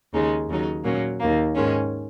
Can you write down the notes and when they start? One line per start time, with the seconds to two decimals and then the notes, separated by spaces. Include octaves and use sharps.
0.13 D#2 C#3 G#3 D#4
0.48 D#2 C#3 F#3 D#4
0.84 A#2 F#3 A#3 C#4
1.19 D#2 D#3 A#3
1.54 G#2 D#3 G#3 C#4